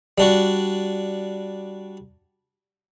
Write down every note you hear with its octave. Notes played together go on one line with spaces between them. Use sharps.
G3 D4 F#4